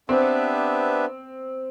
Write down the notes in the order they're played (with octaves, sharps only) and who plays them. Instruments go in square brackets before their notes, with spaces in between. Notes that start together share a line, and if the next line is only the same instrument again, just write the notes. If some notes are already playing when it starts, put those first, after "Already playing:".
[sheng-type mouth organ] B3 D4 G4 B4 E5 [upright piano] C4